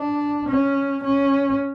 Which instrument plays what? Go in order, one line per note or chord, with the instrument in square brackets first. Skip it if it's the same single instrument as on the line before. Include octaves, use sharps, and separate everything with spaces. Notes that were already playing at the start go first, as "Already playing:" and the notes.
Already playing: [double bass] D4
C#4
C#4